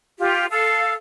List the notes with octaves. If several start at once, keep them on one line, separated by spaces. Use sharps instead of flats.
F4 G4
A4 F5